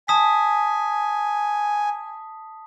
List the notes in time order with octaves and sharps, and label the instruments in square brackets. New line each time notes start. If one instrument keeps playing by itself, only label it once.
[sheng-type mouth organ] G#5 [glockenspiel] A5 D#6 B6